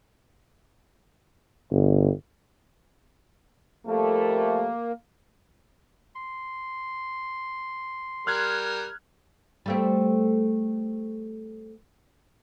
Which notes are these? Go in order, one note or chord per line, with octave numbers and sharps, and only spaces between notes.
G1
F2 G3 A3 A#3
C6
G3 A#4 F6 F#6 G#6
G3 A3 C4